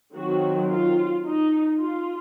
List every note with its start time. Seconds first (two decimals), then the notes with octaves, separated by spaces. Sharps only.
0.15 D#3 F#3 C4 F#4
0.70 F4
1.25 D#4
1.79 F4